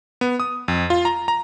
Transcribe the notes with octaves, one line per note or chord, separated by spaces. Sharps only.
B3
D#6
F2
F4
A#5
A#5